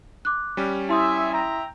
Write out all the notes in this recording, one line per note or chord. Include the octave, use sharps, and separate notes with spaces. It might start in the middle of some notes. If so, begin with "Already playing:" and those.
D6 F#6
G3 C#4 G4
E4 E5 G#5 C6 D#6
E5 G5 A#5